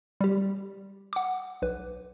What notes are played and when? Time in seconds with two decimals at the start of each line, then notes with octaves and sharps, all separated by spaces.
0.21 G3 G4
1.13 F#5 D6
1.62 B1 B4